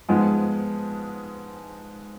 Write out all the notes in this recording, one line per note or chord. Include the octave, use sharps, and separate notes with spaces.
G#2 F3 G#3 B3